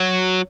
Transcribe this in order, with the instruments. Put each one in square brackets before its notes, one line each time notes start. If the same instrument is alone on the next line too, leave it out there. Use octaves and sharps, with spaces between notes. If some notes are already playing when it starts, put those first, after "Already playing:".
Already playing: [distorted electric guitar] F#3